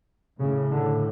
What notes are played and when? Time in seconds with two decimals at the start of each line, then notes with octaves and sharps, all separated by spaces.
0.40 A2 C#3
0.71 D3